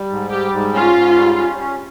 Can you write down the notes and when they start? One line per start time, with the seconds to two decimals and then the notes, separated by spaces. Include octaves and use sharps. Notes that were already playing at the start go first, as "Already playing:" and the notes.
Already playing: G3
0.10 G#2
0.31 G3 G4
0.52 G#2
0.74 C#4 F4
0.95 G#2
1.16 G3
1.38 C#4
1.59 C#4